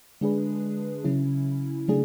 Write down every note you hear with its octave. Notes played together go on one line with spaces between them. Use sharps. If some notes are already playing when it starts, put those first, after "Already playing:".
D3 G#3 D4 G#4 B4
C#3 F#3 C#4 E4
C#3 F#3 A3 D4 G#4